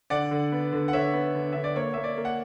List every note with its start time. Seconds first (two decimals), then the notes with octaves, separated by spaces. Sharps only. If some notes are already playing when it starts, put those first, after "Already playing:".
0.10 D3 D5 F#5
0.31 D3
0.52 B3
0.73 D3
0.88 F#5
0.93 D3 C#5 E5
1.13 B3
1.35 D3
1.52 D3 E5
1.64 D5
1.76 A#3 C#5
1.94 A#3 E5
2.04 D5
2.18 A#3
2.25 F#5